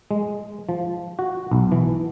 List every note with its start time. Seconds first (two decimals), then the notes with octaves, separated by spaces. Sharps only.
0.11 G#3
0.69 F3
1.19 F#4
1.51 B1
1.72 E3